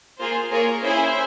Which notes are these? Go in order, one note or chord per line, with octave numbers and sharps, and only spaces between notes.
A#3 F4 G#4 C5
A#3 F4 G#4 A#4 C#5
C#4 E4 G#4 C5 E5